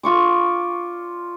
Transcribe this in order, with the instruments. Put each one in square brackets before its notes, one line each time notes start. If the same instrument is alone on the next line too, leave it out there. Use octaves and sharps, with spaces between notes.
[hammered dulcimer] F4 C#6 D6